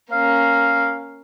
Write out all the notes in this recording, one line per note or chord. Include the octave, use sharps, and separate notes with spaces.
A#3 C#4 F5